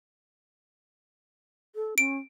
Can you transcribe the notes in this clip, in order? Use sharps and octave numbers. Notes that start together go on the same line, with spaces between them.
A4
C#4 D7